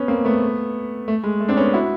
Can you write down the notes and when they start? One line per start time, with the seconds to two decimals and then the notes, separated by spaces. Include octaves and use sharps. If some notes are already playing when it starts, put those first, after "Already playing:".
Already playing: B3 C#4
0.08 A#3 C4
0.25 A3 B3
1.08 A3
1.24 G#3
1.40 A3
1.48 C4 D4
1.57 B3 C#4
1.73 E4 F#4